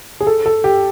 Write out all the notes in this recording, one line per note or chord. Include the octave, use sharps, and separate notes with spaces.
G#4
A4
A4
G4